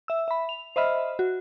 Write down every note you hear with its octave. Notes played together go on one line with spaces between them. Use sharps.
E5 E6
E5 B5
F7
C5 D#5 E5 B5 F6
F#4